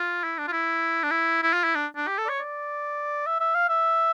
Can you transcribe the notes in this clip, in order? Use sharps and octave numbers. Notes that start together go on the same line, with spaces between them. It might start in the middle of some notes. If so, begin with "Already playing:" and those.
Already playing: F4
E4
D4
F4
E4
D4
E4
E4
F4
E4
D4
D4
G4
A4
D5
C#5
D5
E5
E5
F5
E5